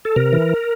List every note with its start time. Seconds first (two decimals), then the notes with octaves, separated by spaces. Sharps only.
0.05 A4
0.16 C3 A#4
0.33 E3